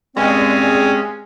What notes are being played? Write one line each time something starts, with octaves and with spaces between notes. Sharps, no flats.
G2 A#2 G#3 C4 C#4